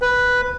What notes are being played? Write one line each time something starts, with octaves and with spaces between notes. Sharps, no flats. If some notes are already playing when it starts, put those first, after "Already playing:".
B4